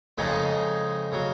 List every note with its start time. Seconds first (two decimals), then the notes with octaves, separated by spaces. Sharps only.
0.18 F2 C#3 F3 G#3 D#4 G#4
1.12 C#3 F#3